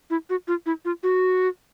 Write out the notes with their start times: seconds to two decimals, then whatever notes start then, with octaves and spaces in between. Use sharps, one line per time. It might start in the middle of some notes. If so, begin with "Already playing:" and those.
0.10 E4
0.30 F#4
0.48 F4
0.66 E4
0.85 F4
1.03 F#4